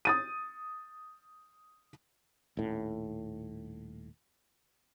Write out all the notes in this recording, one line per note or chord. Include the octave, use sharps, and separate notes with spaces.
D#6 A6 D#7
D#1 A2